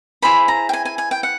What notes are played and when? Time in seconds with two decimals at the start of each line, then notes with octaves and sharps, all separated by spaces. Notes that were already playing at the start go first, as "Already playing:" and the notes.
0.22 E4 G#4 C5 B5
0.48 A#5
0.69 G5
0.73 G#5
0.85 G#5
0.98 G#5
1.11 G5
1.23 F#5